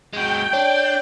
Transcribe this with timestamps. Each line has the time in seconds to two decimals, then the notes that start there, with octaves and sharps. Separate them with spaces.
0.13 G#3 F#4 G5
0.53 D4 C#5